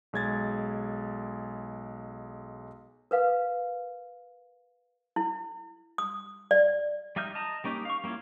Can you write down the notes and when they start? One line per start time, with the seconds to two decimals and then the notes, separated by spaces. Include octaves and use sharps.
0.13 B1 G#3 G#6 A6
3.11 A#4 B4 F5
5.16 E4
5.98 D#6
6.51 D5
7.16 G3 D#4 E5 F6 G6
7.35 D#5 A5 A#5
7.64 G3 A#3 C#4 D#4 G4
7.85 F5 C#6
8.04 G3 A#3 C#4 E4 F4